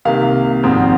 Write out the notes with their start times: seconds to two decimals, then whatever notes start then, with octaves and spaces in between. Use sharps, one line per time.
0.05 C2 C3 D#3 A#3 F5
0.63 G#1 G#2 F3 C4